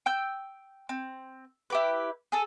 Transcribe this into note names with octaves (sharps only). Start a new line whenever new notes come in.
G5 E6 G6
C4
E4 G4 B4
G#4 A4 E6